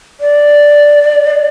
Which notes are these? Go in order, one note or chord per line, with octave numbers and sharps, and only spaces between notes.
D5